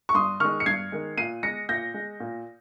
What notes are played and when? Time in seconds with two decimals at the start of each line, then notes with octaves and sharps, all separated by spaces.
0.09 C#6
0.14 G2 C6 D#6
0.40 D#3 G#3 C#6 F6
0.60 C#7
0.66 G2 G#6 C7
0.92 D#3 G#3
1.17 A#2 C7 D#7
1.43 G#3 A#6 C#7
1.69 A#2 G6 A#6
1.94 G#3
2.20 A#2